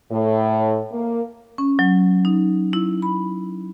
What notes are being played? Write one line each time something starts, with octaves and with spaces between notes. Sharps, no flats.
A2
A#3
C#4
F#3
D#4
E4
B5